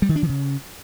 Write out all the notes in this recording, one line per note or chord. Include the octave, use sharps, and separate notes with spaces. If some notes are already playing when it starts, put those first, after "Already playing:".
G3
D#3
D4
E3
C#3